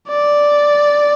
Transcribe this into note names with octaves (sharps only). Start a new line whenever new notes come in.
D5